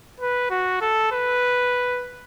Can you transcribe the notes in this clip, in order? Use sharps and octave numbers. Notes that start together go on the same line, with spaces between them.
B4
F#4
A4
B4